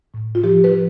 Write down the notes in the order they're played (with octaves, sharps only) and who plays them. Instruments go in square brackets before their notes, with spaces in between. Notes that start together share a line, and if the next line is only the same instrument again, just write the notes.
[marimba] A2
F4
F3 G4
B4
F3